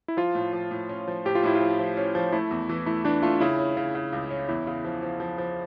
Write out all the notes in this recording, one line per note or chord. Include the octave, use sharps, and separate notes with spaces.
E4
F3 F4
A2
F3
A2
C#4
F3
A2 G4
F4
A2 E4
F4
F3
F3
C#4
F3
A3 E4
E2
E3
A3 E4
E3 D4
A3 F4
C#3 E4
C#4
C#3
C#3
C#2
C#4
E2 E4
C#3
F3
F3
F3
F3